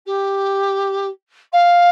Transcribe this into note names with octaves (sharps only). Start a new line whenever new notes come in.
G4
F5